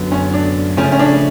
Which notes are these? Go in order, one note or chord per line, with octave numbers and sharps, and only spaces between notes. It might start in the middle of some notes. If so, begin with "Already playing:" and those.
Already playing: F#2 D3 F#3 B3
C#4
D4
C#3 F3 A3 C#4
C#4
D4